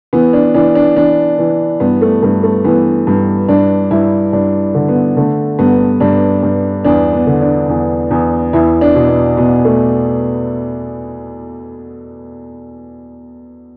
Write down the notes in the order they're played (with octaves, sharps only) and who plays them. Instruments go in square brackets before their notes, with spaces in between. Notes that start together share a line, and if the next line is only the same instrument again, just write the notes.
[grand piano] E3 B3
D4
E3 D4
D4
E3 D4
E3
G2 B3
A3
G2 A3
A3
E3 B3
G2
G2 D4
G2 E4
G2 D4
D3
B3
D3 A3
G2 B3
G2 D4
G2
E2 D4
B3
D3
D4
E2
E2
E2 E4
D4
B2
B3
B2 B3
A3